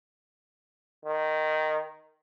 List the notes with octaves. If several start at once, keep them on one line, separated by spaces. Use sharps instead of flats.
D#3